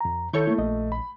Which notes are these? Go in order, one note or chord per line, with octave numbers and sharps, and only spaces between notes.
F2 A#5
D#3 E4 A4 C#5 C#6 G6
A3 A#3 E4
A#1 D#5
B5